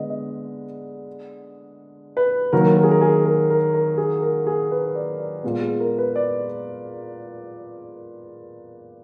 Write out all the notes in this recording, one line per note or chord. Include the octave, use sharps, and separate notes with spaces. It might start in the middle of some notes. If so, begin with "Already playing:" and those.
Already playing: D3 G#3 B3 D#5
D#5
B4
D#3 F#3 A#3 A#4
A#4
G#4
A#4
G#4
A#4
A#4
A#4
G#4
A#4
G#4
B4
D5
D5
A#2 G#3 B3
G#4
A#4
B4
D5